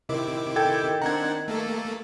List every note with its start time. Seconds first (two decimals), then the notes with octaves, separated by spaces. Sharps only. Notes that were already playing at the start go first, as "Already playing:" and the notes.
0.09 C3 D#3 E4 D6
0.56 A4 G5 G#6
1.02 C4 D4 F#5 A#5 G#6
1.48 A3 A#3 A4